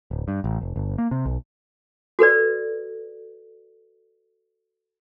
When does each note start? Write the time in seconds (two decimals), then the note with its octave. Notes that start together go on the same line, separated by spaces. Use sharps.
0.11 D1
0.28 G2
0.44 A1
0.61 F1
0.76 G1
0.98 A#3
1.11 C3
1.26 B1
2.19 F#4 A4 B4 D5